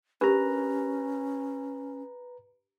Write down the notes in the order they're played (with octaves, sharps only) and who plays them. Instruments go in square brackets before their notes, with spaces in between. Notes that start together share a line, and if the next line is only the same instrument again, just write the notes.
[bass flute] C#4 [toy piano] D4 G4 A#4 [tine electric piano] B4 A#5